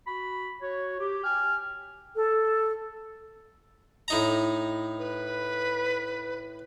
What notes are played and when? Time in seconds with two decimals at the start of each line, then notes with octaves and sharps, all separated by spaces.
0.07 F#4 B5
0.61 F#4 C#5
1.00 G4
1.24 G5 G#5 F6
2.16 A4
4.08 A2 D#4 A#5
4.99 B4